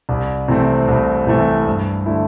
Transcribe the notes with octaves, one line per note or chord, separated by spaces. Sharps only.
C2
C3 E3 A3 C4
C2
C3 E3 A3 C4
G2
D3 A3 E4